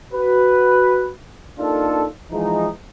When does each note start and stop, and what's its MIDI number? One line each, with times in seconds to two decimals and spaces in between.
0.13 1.10 66
0.13 1.10 71
1.59 2.05 58
1.59 2.05 62
1.59 2.05 63
1.59 2.05 65
1.59 2.05 69
2.31 2.68 52
2.31 2.68 53
2.31 2.68 56
2.31 2.68 63